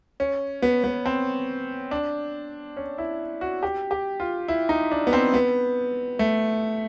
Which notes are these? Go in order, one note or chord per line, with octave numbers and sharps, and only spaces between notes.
C#4
B3
B3
C4
D4
C#4
E4
F#4
G4
G4
F4
E4
D#4
D4
B3
C4
B3
A3